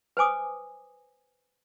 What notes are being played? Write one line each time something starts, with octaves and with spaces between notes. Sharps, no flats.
B4 C5 G#5 D6 D#6